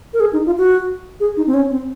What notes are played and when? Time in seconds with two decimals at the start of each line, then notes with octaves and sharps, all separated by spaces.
0.14 A#4
0.20 G#4
0.33 D#4
0.46 F4
0.58 F#4
1.20 G#4
1.37 D#4
1.47 C4
1.54 C#4
1.71 C4